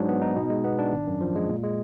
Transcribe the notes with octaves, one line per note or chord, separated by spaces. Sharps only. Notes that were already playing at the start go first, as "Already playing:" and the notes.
Already playing: G#2 F#3 D4
B3
D#4
B2
G#3
B3
D4
G#1
F#2
F3
G#3
A#2
G#3